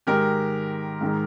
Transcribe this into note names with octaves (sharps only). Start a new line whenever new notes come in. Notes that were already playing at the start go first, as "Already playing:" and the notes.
G#2 D#3 G#3 G4 A#4
G#2 D#3 G#3